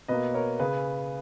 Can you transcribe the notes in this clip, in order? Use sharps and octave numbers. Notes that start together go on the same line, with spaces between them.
B2 A#3 B4 D#5
A#4 C#5
C#3 G#4 B4